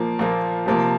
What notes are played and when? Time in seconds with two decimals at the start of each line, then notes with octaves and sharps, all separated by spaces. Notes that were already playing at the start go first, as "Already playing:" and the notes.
Already playing: A#2 F3 A#3
0.19 A#2 F3 A#3
0.66 C3 F3 A#3